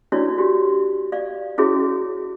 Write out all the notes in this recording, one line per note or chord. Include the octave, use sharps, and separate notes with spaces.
D4 E4 F#4 B4 C#5 D5
F#4 G4
D5 F5
C#4 E4 F#4 G#4 C#5 E5